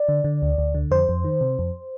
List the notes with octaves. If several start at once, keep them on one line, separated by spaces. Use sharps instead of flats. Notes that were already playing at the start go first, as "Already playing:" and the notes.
Already playing: D5
D3
D3
D2
D2
D3
F2 C5
F2
D#3
C3
F2